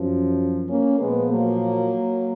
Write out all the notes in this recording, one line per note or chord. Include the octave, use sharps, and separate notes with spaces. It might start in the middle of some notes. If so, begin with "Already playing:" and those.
Already playing: F#2 F3
A#3 C#4
A#2 F3 G#3 B3
F#3 A#3